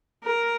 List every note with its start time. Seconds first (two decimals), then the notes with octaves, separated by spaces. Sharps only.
0.24 A#4